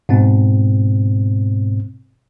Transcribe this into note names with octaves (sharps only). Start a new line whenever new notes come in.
G#2 B2 C4